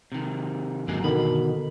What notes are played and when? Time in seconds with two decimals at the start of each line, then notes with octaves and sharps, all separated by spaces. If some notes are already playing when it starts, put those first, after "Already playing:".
0.12 C3 D#3
0.88 G1 F#3 G#3 A#3
1.04 B2 D3 D#3 B5